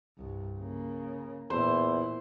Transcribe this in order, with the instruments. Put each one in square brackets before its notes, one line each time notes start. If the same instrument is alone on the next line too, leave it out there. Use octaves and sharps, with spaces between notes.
[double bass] C2 G2
C#3 A#3
[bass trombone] E2 [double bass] A#2 E4 [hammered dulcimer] C5